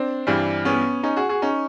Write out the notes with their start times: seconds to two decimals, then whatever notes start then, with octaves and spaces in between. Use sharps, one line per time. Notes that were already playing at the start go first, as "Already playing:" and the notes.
Already playing: C4 D4
0.27 G2 E3 G3
0.65 B3 C#4
1.03 C#4 D#4
1.16 F#4 G#4
1.29 F#4 G#4
1.42 C#4 D#4